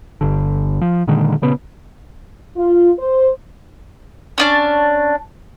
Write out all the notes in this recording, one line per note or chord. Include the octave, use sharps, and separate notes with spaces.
G1 D3
F3
A#2 D3 D#3 G#3
A#2 C#3 B3
F4
C5
C#4 D4 A5